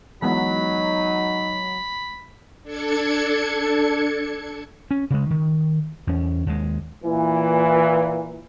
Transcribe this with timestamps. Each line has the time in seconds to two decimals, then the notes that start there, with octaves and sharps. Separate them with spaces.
0.22 E3 F#3 G#3 B3 D#4 B5
2.63 D4 A4 G#6 C#7
4.91 C#4
5.10 C#3 G#3
5.30 D#3
6.07 E2 C#4
6.46 D#2 G#3
7.04 A#2 E3